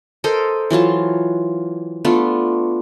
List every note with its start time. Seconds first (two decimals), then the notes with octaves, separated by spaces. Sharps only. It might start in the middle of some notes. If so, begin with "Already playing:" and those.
0.24 A4 A#4 C5 D#5
0.70 E3 F#3 F4 A5
2.05 A3 B3 D4 F4